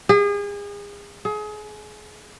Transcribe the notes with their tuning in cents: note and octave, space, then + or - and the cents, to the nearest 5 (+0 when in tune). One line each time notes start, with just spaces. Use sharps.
G#4 -35
G#4 +30